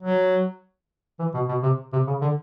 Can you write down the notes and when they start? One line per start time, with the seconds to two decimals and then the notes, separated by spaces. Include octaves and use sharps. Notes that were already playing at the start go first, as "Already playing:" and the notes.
0.02 F#3
1.19 E3
1.34 B2
1.48 B2
1.63 C3
1.93 C3
2.07 C#3
2.21 D3